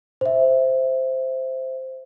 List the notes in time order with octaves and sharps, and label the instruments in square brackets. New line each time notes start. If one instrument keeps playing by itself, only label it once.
[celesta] C5 E5